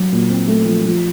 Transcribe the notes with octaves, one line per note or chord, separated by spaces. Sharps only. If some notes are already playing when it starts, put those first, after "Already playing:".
Already playing: F#3
A#2
C4
A3
F3
F3